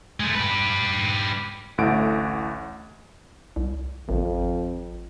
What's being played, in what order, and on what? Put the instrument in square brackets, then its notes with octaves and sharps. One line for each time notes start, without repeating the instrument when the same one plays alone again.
[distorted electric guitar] G#3 A3
G4 B4
[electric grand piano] A1 D2 A2 F#5 D7
[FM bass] C2
[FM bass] G#1 [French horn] F2